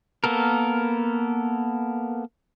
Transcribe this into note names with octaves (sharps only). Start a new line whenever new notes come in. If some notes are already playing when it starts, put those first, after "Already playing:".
A#3 B3 A4 A#4